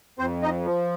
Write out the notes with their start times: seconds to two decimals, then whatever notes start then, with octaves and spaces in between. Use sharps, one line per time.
0.19 F2 C4 C5
0.42 D#4 D#5
0.65 F3